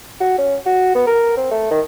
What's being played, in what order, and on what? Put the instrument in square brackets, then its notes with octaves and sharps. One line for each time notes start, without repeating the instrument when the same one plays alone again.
[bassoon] F#4
C#4
F#4
B3
A#4
C4
A3
D#3